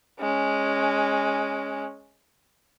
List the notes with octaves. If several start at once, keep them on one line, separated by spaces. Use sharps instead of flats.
G#3 C#4